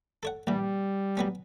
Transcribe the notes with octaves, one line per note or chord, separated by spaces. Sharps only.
A4 C#5 F#5
A#1 E3 G3
F#3 B3 C#4